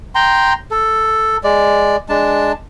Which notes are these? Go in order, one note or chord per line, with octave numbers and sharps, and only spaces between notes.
G5 A#5 C6
A4
G#3 D5
G#3 D4 A5